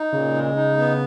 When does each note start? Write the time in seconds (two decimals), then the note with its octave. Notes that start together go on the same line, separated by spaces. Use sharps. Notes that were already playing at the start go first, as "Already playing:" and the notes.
Already playing: D#4
0.13 A#2 C#3
0.35 G#3
0.56 D#4
0.78 B3